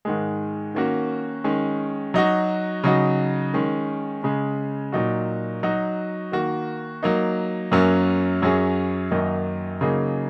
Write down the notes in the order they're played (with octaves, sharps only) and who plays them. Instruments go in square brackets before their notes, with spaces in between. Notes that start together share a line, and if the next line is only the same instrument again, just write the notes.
[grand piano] G#2 D#3 G#3
D#3 A#3 C#4 F#4
D#3 G#3 C#4
F#3 D#4 F#4
C#3 F#3 D#4 F#4
D#3 G#3 C#4
C#3 G#3 C#4
A#2 F#3 D#4 F#4
F#3 D#4 F#4
D#3 A#3 F#4
F#3 A#3 D#4
F#2 F#3 A#3 C#4
F#2 F#3 C#4 G#4
F#2 D#3 F#3 A#3 D#4
C#3 F#3 A#3 D#4 G#4